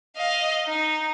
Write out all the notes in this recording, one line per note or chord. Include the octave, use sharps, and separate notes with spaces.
D#5 F5
D#4